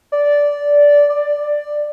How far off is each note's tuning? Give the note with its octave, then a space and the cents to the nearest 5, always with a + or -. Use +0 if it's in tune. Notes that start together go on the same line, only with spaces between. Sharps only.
D5 -10
D5 +10